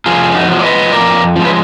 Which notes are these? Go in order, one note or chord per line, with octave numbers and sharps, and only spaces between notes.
F2 F4 G#4
D#4 F#4
F3 G#3
D5
B4 D#5
F2 A#4 D5
F3 G#3
B4